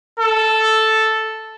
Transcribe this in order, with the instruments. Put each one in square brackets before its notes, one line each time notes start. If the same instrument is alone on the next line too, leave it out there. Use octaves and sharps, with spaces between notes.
[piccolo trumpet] A4